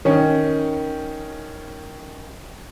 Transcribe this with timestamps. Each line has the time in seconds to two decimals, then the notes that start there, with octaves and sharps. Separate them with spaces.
0.05 D#3 C#4